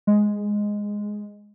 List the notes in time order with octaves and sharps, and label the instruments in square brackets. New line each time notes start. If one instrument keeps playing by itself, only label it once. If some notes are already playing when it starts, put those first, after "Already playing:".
[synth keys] G#3